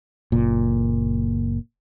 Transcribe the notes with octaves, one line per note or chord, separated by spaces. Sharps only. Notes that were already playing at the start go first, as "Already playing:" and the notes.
F#1 A#2